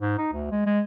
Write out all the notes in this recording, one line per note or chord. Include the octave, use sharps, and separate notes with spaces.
G#2
D#4
D2
G#3
G#3